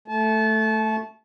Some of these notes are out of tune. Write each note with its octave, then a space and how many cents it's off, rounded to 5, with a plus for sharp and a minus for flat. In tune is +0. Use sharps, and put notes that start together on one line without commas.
A3 +0 A5 -30